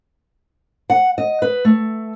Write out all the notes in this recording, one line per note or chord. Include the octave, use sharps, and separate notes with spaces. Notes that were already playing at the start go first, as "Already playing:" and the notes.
F#5
D#5
B4
A3